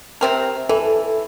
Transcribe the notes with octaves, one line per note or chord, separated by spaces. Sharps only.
C3 C4 A#4
E3 A4